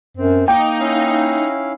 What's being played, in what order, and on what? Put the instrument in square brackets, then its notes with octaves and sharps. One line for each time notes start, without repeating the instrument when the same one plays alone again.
[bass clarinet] F#2 [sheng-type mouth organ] C4
[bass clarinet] A#3 [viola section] D#4 [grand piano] G5 [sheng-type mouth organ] D6
[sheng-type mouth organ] C#4 E4 F5